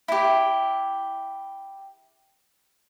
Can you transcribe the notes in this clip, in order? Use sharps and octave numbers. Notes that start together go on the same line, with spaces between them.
E4 G4